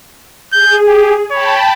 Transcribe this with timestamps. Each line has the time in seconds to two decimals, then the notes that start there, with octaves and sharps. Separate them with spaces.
0.53 G#4 G6
0.87 G4
1.31 C#5 G5 A5 B5